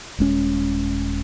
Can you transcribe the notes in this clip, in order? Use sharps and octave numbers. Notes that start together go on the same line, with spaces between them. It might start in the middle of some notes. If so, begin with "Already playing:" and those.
D#1 G#3 C#4